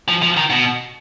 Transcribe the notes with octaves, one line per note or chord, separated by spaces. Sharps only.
F3
F3
D#3
B2